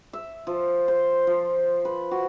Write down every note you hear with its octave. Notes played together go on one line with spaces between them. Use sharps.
E5
F3
C5
F3
B4
F#4